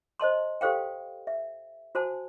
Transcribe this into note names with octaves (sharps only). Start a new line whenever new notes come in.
C5 D#5 A5 C6
G4 A4 C5 F5 G5
E5
F#4 C5 G#5 A5